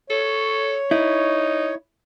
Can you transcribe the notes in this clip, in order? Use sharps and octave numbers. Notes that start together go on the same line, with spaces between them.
A4 C#5
D#4 E4